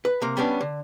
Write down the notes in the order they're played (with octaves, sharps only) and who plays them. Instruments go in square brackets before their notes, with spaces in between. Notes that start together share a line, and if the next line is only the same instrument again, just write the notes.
[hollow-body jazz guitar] B4
C3 A#3
G3 B3 C#4 D4
D3